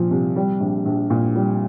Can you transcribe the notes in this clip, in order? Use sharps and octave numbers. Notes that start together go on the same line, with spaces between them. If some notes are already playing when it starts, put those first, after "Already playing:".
Already playing: A#2 F3
C2
G3
A#1
A#1
A#2
G3